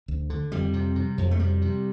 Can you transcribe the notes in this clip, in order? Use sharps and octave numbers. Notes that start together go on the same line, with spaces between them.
D2
D3
F2 G3
C3
C3
F2
A3
C3 G3
C3